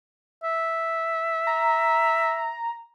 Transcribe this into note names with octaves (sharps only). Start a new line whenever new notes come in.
E5
A#5